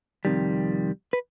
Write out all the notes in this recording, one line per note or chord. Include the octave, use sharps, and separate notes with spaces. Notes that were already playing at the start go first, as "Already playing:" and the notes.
F2 C3 D#3 G3
B4